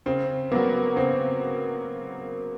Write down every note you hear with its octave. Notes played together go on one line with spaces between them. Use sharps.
C#3 C4
F#3 A#3 B3
C#3 C4